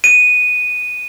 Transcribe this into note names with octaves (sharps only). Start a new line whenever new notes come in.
D#7